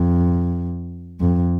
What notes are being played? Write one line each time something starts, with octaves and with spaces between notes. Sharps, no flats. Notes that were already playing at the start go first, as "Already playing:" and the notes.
Already playing: F2
F2